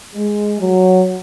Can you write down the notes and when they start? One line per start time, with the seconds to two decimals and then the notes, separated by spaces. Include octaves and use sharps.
0.15 G#3
0.60 F#3